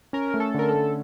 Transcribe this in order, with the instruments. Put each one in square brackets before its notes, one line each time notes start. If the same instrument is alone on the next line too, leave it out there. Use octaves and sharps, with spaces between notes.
[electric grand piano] C#4 [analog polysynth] A#4
[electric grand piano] A3
[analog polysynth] A4
[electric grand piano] D3 [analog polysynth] A#4
[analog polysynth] A4
[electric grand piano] A3